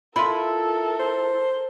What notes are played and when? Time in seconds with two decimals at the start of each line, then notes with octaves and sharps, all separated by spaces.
0.16 E4 F4 A4 A#4 E5 B5 C6
1.00 C5